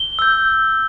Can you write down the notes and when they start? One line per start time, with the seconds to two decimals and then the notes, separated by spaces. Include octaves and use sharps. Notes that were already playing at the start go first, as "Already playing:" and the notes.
Already playing: G7
0.19 E6 G6